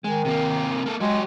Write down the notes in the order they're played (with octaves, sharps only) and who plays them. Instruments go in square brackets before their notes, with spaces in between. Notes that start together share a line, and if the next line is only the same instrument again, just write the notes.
[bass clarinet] D#3 [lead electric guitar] G#3
[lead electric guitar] C3 A#3
A#3 A4
[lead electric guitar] F#3 G4 [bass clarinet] G#3